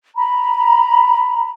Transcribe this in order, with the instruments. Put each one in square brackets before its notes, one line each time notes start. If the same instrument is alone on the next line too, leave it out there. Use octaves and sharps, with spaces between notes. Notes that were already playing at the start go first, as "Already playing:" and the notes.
[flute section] A#5 B5